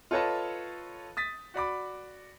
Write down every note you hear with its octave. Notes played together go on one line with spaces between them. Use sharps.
F4 A4 B4 C#5 D#5 A5
D#6 A6 B6
F#4 D5 B5 D6